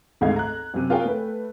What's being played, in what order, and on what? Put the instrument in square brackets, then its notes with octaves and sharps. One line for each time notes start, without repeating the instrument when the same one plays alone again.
[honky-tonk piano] G#1 D2 G#2 D#3 F5 G#6
A#5 F#6
F#2 C3
F4 G#4 A#4 C#5 G5 G#5
A3 B4